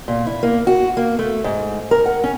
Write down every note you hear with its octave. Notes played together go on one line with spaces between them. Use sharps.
A#2
E4
A#3
F#4
A#3
A3
G#2
A#4
F#5
C#4